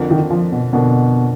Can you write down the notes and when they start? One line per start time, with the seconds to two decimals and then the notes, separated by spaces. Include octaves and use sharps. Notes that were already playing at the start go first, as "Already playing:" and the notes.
Already playing: F2 D3 F3 A#3 D4
0.11 D#3
0.30 F3
0.52 B2
0.73 F2 B2 D3 F3 A#3 D4